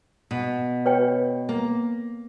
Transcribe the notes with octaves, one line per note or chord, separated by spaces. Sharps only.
B2
B4 C#5 G5
A#3